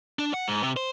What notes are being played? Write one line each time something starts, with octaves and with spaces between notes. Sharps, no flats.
D4
F#5
G#2
C3
C5